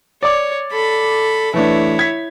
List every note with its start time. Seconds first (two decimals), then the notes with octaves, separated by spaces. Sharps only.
0.23 C#5 D5 D6
0.71 A4 B5
1.54 E3 A3 D4 E4 C#5
1.99 G#6 B6